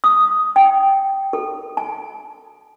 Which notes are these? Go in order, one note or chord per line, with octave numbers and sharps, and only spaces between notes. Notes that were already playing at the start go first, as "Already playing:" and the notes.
D#6
G5
A4
A5